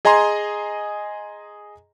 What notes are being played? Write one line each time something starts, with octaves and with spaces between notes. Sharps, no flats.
G#4 D#5 G#5 A#5 C6